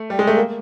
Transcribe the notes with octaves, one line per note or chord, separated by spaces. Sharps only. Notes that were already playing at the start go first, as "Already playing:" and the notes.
Already playing: A3
G3
G#3
A3
A#3